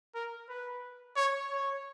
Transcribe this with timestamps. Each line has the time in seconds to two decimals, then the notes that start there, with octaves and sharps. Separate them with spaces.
0.15 A#4
0.49 B4
1.16 C#5
1.50 C#5